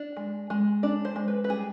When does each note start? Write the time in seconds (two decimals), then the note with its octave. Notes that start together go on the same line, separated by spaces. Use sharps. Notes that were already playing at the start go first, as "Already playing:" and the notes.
Already playing: D4
0.17 G#3
0.50 G#3
0.83 D4 D5
1.05 C5
1.16 G#3
1.28 B4
1.44 B4
1.49 G3 G#4